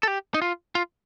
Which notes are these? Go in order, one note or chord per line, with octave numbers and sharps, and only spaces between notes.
A4
G4
D#4
F4
F4